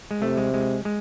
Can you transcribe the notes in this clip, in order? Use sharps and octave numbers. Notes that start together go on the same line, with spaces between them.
G#3
C3 A3
G#3
G#3
G#3